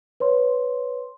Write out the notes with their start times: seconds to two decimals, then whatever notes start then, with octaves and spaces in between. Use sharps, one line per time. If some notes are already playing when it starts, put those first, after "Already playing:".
0.20 B4 C#5 C6